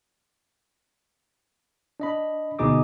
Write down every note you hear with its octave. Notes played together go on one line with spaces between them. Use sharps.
D4 D#5 B5
D2 B2 D#4 G#4 D6 D#6